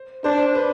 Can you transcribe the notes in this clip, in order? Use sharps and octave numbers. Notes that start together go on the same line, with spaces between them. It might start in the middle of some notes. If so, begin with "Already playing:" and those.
Already playing: C5
D4 C5
B4